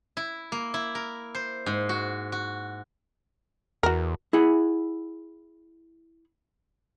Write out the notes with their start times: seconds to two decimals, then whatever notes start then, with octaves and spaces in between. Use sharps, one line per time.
0.17 E4
0.52 A#3
0.74 E4
0.95 A#4
1.35 C5
1.66 G#2
1.89 F#4
2.32 F#4
3.83 E2 F#4 A#4
4.33 E4 G#4 F#5